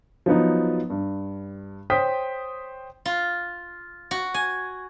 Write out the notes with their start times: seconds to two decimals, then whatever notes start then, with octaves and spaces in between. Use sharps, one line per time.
0.26 F3 F#3 B3 D#4
0.90 G2
1.90 C5 C#5 G5 D#6 B6
3.05 F4
4.11 F#4
4.34 G#5